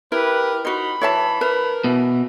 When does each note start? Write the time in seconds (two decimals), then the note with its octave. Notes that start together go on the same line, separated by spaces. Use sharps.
0.12 E4 G4 A#4 B4
0.65 D#4 F#4 C5 B5
1.01 E3 C#5 E5 A5
1.41 A#4 B4
1.84 B2 E3